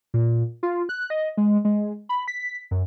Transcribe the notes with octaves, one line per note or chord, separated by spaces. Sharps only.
A#2
F4
F#6
D#5
G#3
G#3
B5
B6
F#2